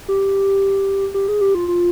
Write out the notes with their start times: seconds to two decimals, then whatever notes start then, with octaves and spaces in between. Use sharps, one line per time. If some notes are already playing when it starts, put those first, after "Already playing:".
0.08 G4
1.14 G4
1.28 G#4
1.41 G4
1.55 F4
1.68 F4